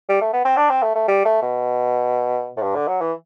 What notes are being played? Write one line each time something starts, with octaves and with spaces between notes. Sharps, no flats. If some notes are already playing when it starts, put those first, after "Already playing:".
G3
A3
B3
C4
D4
C4
A3
A3
G3
A3
B2
A2
G2
D3
F#3
E3